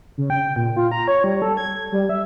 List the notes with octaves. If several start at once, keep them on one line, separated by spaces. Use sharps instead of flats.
C#3
G5
A#2
F4
A#5
C#5
G3
A4
G#6
G3
E5